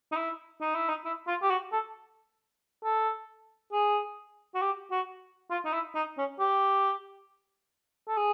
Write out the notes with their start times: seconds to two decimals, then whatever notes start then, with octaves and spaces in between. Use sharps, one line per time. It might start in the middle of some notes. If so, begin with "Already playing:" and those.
0.12 D#4
0.16 E4
0.61 D#4
0.75 E4
0.88 D#4
1.05 E4
1.27 F4
1.43 G4
1.50 F#4
1.72 A4
2.84 A4
3.73 G#4
4.55 F#4
4.62 G4
4.91 F#4
5.50 F4
5.65 D#4
5.73 E4
5.95 D#4
6.18 C#4
6.39 G4
8.08 A4
8.17 G#4